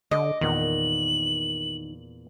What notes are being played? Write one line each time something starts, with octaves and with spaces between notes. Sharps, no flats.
D3 D#5 D6
E2 A#2 D#3 F#5 F#7